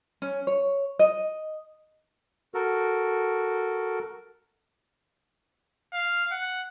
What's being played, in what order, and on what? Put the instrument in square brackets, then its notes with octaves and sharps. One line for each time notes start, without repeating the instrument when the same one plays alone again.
[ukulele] C#4
C#5
D#5
[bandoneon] F#4 A4 A#4
[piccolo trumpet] F5
F#5